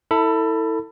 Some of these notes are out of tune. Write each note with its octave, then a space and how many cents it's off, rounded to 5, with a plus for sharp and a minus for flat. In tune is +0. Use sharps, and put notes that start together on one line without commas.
E4 -20 A4 +25 B5 +0